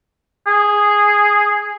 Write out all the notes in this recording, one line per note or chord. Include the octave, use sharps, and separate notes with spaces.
G#4